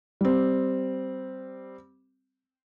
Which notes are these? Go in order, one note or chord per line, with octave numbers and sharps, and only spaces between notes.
G3 C4